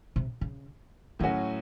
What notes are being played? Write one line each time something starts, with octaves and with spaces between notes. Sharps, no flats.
C3
C#3
A2 D#3 F#3 C#4 F#4